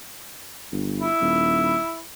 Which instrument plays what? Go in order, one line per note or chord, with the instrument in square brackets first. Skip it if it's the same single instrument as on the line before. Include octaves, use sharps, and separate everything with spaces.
[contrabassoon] G1
[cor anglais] E4
[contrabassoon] D#1